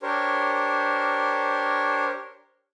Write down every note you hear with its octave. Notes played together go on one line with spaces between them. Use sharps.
D4 G4 A#4 C5 C#5